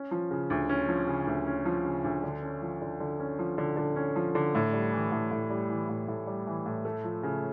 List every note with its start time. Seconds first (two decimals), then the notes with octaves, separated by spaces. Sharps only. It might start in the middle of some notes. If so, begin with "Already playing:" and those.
Already playing: C#4
0.11 F3
0.31 C#3
0.50 D2
0.69 C#4
0.88 F3
1.07 C#3
1.27 D2
1.47 C#4
1.66 F3
1.85 C#3
2.04 D2
2.23 D3
2.42 C#4
2.62 F3
2.82 D3
3.00 D3
3.20 C#4
3.39 F3
3.58 D3
3.77 D3
3.96 C#4
4.16 F3
4.35 D3
4.55 A2
4.73 G3
4.93 E3
5.12 A2
5.31 A2
5.50 G3
5.70 E3
5.89 A2
6.08 A2
6.27 G3
6.47 E3
6.66 A2
6.85 A3
7.04 F3
7.23 C#3